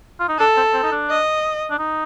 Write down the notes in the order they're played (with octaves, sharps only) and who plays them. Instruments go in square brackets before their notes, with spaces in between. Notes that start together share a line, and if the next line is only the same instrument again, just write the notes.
[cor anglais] F4
D#4
[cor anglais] D4 [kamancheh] A4
[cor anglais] C4
C4
D#4
D4
[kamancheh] D#5
[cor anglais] D4
D#4